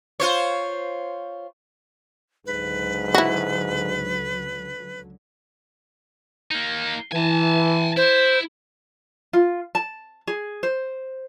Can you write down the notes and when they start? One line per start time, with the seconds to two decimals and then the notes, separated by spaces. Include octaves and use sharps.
0.20 F4 C5 C#5
2.46 C#2 G#2 D3 F#3 B4
3.14 E4 F#4
6.51 A#3 D#4
7.11 E3 G#5 A5
7.97 E4 C5
9.33 F4
9.75 A5
10.27 G#4
10.63 C5